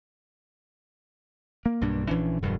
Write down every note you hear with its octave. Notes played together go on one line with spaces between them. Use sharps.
A#3
B1 G2 A#3 D4
A#1 E3 C#4 D4
E1 G2 F#3